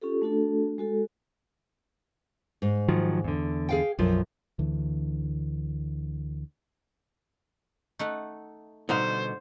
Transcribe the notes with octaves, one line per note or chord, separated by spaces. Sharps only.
C#4 F4 G4 A4
A3 D4 F#4 A4
G#3 F#4 A4
G#2
D#3 F3 F#3
E2 D3
G#4 F5 G5
B1 F#2 F3
D2 D3 E3
A3 D#4 F#5
B2 D3 G3 B3 D#4 C5 F5